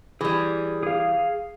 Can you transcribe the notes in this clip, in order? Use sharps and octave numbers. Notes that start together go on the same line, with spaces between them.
E3 G3 G#4
G#4 F5